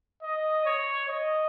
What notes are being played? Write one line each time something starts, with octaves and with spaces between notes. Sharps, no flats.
D#5
C#5
D#5